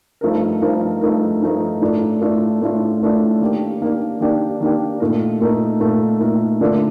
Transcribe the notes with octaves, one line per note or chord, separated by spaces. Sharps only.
G2 F3 A3 D#4 A#4
G2 F3 A3 D#4 A#4
G2 F3 A3 D#4 A#4
G2 F3 A3 D#4 A#4
A2 A3 D4 F4
A2 A3 D4 F4
A2 A3 D4 F4
A2 A3 D4 F4
D#3 A#3 D4 G4
D#3 A#3 D4 G4
D#3 A#3 D4 G4
D#3 A#3 D4 G4
A#2 A3 D#4 A#4
A#2 A3 D#4 A#4
A#2 A3 D#4 A#4
A#2 A3 D#4 A#4
D3 A3 D4 F4 A4